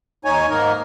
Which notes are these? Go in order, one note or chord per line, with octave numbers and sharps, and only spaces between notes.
D#2 D#4 C#5 G#5
G#2 A#3 D#4 A#4